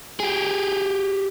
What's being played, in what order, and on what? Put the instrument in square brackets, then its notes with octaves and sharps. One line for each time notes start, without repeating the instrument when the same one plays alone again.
[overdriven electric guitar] G4 G#4